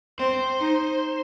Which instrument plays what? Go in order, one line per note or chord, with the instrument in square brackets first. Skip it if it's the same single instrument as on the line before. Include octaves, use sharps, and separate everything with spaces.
[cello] C4 [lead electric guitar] C5
[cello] D#4